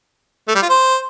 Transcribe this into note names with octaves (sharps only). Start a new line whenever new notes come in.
A3
G3
F4
C5